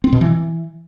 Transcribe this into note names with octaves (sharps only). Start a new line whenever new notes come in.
C4
B2
E3